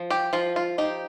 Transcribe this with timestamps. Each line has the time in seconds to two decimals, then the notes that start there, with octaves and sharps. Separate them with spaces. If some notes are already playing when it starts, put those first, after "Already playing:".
Already playing: F3
0.11 G4
0.33 F3 F4
0.56 F4
0.78 D#4 G4